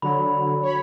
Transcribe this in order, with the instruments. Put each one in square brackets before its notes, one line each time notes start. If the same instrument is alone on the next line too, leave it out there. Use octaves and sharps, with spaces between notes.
[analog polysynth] D3 F#3 [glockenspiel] B5
[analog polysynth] C#5 B5